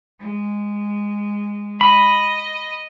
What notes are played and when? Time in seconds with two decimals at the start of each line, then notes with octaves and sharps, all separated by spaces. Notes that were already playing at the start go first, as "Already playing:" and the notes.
0.20 G#3
1.81 D#5 B5